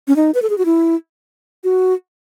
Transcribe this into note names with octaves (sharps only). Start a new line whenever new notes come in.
C#4
D#4
B4
A4
G#4
F#4
E4
F#4